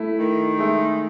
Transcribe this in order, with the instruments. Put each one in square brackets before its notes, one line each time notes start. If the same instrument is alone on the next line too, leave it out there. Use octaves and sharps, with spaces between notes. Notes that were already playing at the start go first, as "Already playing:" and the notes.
Already playing: [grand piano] A3 [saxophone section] E4
[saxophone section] D#3
[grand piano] G#3 [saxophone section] A3